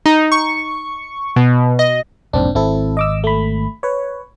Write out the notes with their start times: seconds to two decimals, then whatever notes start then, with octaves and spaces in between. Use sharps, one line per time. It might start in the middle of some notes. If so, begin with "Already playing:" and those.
0.06 D#4
0.32 C#6
1.36 B2
1.79 D#5
2.33 E1 A#1 E2 G#2 C4 D4
2.55 G#1 C4 E4 A4
2.97 D#5 D6 E6
3.24 A3 B5
3.83 B4 C#5